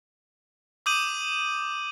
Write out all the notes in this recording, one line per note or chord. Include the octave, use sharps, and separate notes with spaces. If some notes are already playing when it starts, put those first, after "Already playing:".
D6 D#6 G6 D#7 F#7